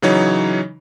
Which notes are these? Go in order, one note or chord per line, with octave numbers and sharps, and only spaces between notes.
C#3 E3 F#3 D#4 C#5